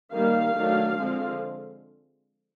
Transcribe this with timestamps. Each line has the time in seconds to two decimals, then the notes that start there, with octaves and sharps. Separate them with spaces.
0.13 D#3 G3 A#3 F5
0.55 D#3 F#3 A3 D4
0.97 D3 F3 G#3 C4